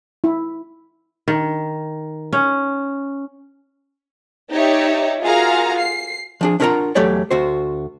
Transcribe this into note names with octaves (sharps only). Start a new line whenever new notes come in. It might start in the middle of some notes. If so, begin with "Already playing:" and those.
E4
D#3
C#4
D#4 G4 C#5 D5 E5
F4 F#4 G#4 A#4 F5 A#5
C7
F3 D4 G#4
D4 E4 F4 A#4 F#5 A#5
E2 F#3 A3 G4 C#5 D5
D2 F#4 C5